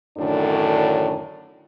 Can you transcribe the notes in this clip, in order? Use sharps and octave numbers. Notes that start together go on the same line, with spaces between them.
F#2 A2 D3 D#3 D4